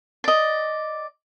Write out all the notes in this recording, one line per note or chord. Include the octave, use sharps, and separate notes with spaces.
D5 D#5